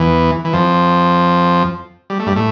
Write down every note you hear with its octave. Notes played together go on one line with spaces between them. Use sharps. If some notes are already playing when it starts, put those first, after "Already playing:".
Already playing: E2 E3
E3
F2 F3
G3
A3
G2 G3
A2 A3